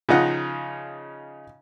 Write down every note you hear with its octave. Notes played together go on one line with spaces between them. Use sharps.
C#3 F3 D#4 F#5